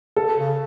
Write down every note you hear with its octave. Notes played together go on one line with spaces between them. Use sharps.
A4
C#3